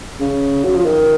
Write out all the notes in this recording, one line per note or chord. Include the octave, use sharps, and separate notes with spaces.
C#3
F#3
F3
D#3